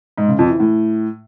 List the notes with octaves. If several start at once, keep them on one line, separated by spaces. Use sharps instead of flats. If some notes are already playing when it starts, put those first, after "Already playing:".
G#2
C#3
F2
E3
A2